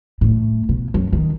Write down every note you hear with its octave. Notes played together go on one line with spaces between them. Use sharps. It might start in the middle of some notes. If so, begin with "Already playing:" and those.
A2
B2
F#2
D#3